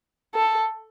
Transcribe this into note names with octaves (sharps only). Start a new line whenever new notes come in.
A4